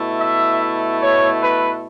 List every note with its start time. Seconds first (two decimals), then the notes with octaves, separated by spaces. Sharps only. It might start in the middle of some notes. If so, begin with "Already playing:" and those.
Already playing: B2 A3 E4
0.19 E5
1.01 C#5
1.41 B4